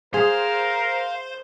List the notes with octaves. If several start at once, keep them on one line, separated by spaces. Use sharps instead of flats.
G#4 A#4 C5 F5